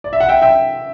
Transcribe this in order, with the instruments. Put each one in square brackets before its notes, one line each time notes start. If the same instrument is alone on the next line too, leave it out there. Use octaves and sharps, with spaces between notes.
[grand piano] D5
E5
F#5
E5 G5
E5 G5